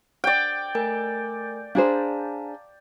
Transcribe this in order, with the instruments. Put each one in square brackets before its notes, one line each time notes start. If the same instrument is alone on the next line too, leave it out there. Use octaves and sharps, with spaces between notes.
[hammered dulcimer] D5 G5
[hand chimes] A3 A#4 G#5
[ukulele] D4 G#4 C5 [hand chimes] F5 A5 A#5